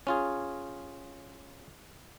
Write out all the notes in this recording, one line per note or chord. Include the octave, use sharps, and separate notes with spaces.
C#4 F4 G#4